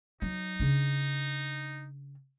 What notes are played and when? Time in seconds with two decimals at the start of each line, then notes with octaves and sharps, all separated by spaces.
0.22 F#3 D#4
0.60 C#3 D4